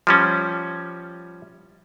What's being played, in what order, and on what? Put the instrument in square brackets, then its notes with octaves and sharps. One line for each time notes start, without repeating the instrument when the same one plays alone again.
[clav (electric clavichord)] F3 G3 C#4